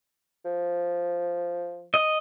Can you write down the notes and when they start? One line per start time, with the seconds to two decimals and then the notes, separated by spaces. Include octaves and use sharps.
0.45 F3
1.94 D#5